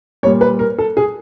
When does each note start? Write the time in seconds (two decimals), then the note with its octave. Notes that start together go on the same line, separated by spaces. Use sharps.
0.23 G3 C#5
0.26 A#2
0.41 B4
0.59 A#4
0.78 A4
0.97 G#4